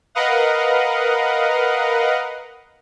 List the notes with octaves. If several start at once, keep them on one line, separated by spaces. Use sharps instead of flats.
A#4 B4 D#5 F5 F#5